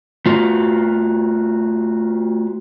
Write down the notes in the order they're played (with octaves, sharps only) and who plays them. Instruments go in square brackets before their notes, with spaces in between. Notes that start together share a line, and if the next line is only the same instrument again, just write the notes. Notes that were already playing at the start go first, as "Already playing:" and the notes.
[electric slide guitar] A3 F4 F#4